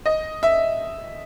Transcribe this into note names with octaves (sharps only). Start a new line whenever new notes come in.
D#5
E5